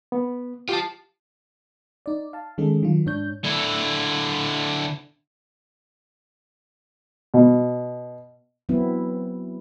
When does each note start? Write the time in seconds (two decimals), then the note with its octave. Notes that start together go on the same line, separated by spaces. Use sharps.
0.12 B3
0.69 F4 G4 A5
2.06 D#4 D5
2.33 F5 A5
2.58 D#3 G#3 C#4 G#4 A4
2.83 D#3 F#3 F4
3.06 G#2 D4 C#5 G6
3.44 D3 E4
7.34 B2
8.69 E3 F#3 B3 C4 E4